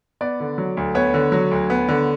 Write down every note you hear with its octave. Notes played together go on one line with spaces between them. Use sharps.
B3 D5
D3
F#3
D2
B3 C#5
D3
F#3
D2
B3
D3